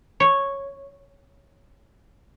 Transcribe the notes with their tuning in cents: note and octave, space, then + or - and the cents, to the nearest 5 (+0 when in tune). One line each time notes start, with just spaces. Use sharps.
C#5 -5